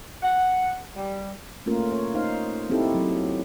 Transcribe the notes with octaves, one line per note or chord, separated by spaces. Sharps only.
F#5
G3
A3 A#3 C#4 F4 A#4
C#5
D#4 C5 F5
C4 D#4 E4 G4 A4
F#3